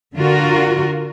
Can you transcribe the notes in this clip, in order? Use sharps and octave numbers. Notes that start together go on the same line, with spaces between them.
D3 F4 F#4 A#4